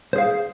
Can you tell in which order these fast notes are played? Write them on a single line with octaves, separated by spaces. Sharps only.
C5 G#4 F5